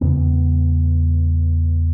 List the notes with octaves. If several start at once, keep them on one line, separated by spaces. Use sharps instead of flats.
E2 C#3 G#3 B3